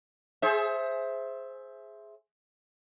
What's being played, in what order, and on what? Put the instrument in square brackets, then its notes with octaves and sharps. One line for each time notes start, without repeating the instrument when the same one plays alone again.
[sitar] G#4 C5 E5